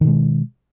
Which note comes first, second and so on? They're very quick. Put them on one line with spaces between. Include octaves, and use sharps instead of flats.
D#3 B2 G#3